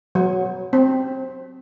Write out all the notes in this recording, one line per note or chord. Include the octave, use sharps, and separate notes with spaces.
F#3
C4